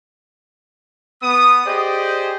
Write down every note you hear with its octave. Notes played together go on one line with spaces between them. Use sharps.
B3 D#6
G4 G#4 C5 D5 D#5